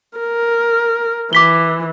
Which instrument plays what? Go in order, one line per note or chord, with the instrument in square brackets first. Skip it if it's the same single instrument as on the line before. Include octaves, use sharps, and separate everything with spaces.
[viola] A#4
[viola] E3 [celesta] D6 B6 G7